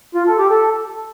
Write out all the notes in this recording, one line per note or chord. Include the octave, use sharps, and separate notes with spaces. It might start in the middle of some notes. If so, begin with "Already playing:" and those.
F4
A4
G4
A4